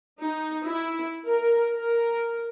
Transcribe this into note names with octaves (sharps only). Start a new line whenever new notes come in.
D#4
E4
A#4
A#4